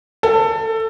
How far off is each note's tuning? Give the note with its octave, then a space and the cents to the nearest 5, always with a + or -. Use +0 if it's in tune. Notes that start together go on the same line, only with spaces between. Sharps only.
A4 +20